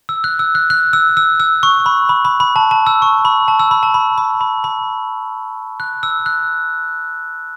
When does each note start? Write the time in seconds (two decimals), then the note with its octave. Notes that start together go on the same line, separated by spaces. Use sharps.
0.09 E6
0.24 F#6
0.39 E6
0.55 F#6
0.70 F#6
0.93 E6
1.17 E6
1.40 E6
1.63 C#6
1.86 B5
2.09 B5
2.25 B5
2.40 B5
2.56 A5
2.71 A5
2.87 E6
3.02 C#6
3.25 B5
3.48 A5
3.60 E6
3.71 B5
3.83 A5
3.94 B5
4.18 B5
4.41 B5
4.64 B5
5.80 F#6
6.03 E6
6.26 F#6